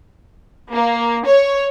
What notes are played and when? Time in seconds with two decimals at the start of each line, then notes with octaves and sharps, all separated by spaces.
0.72 A#3
1.25 C#5